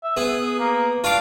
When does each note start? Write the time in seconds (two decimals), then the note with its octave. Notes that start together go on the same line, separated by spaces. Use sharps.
0.04 E5
0.17 B3 G#4
0.59 A#3
1.04 D4 F4 F5 D6